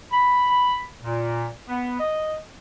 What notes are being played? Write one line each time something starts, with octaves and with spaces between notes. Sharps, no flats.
B5
A#2
B3
D#5